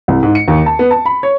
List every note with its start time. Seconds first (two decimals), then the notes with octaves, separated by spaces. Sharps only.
0.08 C2
0.23 G#2
0.35 C#7
0.48 D#2
0.66 A5
0.79 B3
0.91 A5
1.06 B5
1.23 C#5